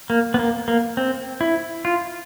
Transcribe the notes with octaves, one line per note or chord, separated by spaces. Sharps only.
A#3
B3
A#3
A#3
C4
E4
F4